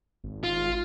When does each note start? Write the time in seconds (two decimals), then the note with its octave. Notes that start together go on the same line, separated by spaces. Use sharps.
0.24 G#1
0.44 F4